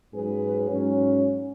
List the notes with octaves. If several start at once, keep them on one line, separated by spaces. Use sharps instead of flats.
G#2 F#3 C#4 G#4 B4
G#2 F#3 C#4